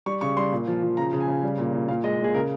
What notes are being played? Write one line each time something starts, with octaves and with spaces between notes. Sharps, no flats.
G3 C#6
C#3 C#6
G3 C6
A#2
F3
F3
C#3 A#5
C#3
G#5
C#3
G3
A#2
A#2
A#2 F5
G#3 D#5
A#2
G#4
C#3 A#4